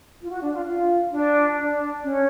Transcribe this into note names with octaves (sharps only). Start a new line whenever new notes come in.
F4
F#4
D4
F4
F4
D4
D4
C#4